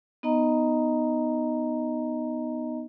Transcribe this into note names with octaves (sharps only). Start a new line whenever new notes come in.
B3 D#4 D#5 A#5